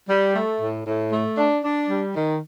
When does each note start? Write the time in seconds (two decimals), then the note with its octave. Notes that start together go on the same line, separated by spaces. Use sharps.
0.09 G3
0.34 A3
0.61 A2
0.86 A2
1.12 A3
1.37 D4
1.64 D4
1.89 G3
2.15 D#3